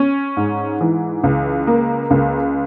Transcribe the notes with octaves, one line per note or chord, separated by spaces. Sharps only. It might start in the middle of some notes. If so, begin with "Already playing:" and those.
Already playing: C#4
G#2
E3
C#2
A#3
C#2